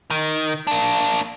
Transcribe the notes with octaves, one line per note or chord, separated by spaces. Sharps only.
D#3
A#3 D4